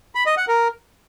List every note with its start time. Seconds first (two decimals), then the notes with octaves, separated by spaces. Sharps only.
0.15 B5
0.26 D#5
0.37 F#5
0.48 A#4